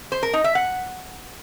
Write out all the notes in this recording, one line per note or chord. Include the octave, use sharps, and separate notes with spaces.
C5
A#4
D#4
E5
F#5